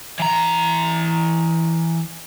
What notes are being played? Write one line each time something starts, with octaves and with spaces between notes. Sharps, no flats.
E3 A#5